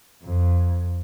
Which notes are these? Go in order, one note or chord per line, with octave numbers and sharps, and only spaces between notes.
F2